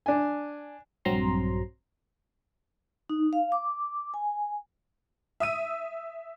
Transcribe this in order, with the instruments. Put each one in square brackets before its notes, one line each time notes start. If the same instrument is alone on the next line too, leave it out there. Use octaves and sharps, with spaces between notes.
[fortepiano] D4 G#5
[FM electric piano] A#1 G2 F#3 C4 A#5 C6
[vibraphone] D#4
F5
D6
G#5
[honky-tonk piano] E5 D#6 E6 D#7